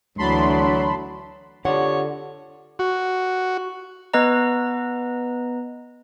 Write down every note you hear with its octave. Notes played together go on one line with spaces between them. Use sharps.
D2 E3 F#3 A5 B5 C6
D3 F4 G4 A4 C#5 F#5
F#4
B3 B4 D#5 A#5